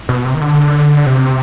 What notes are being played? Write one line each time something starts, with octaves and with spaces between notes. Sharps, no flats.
B2
C3
D#3
D3
C3